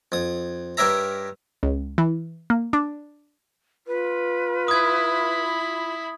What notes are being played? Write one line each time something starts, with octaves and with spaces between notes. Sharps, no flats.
F2 D#6
G2 G4 A#4 C#5 E5 A#5
C#2
E3
A#3
D4
F4 B4
E4 B5 D#6 G#6